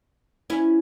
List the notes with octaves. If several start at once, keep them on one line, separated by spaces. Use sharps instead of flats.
C#4 E4